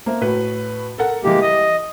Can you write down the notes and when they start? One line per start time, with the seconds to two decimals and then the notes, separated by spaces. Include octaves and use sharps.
0.06 A#3 C5 E5
0.21 A2 F#4 B4
0.98 A4 A#4 F#5
1.23 E3 G3 G#3 A#3 G4
1.42 D#5 D#6